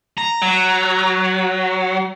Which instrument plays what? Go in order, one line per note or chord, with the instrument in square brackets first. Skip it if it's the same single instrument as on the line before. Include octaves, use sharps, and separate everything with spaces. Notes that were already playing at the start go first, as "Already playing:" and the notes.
[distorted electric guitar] A#5
[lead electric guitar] F#3